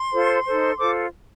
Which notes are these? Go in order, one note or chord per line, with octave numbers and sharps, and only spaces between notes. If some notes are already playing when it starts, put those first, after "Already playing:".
Already playing: C6
F4 A4 C5
D#4 A4 C5
F4 A4 C5 D6